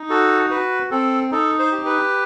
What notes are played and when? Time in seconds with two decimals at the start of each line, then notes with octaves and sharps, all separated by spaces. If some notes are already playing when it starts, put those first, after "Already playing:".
Already playing: D#4
0.09 F#4 A4
0.50 F#4 B4
0.91 C4 A4
1.31 D#4 A4
1.59 C5
1.72 G4
1.85 B4